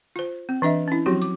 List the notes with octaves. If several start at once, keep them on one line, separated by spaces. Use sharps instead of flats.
F4 C5
C4
E3 D4 D#5 E5
C#4 E4
F3 F#3 C4 F#4 G4
D6